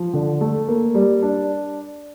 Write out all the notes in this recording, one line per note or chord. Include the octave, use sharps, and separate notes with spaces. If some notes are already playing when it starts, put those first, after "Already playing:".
Already playing: F3
D3
A3
A#3
G3
D4